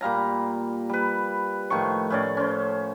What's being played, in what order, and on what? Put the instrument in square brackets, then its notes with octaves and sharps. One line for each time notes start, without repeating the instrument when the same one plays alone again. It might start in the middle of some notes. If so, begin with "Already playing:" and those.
[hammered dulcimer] A#2 G3 F5 A#5
G3 B4
A2 D#3 F3 C#6
A2 C#4 D5
C#4 C5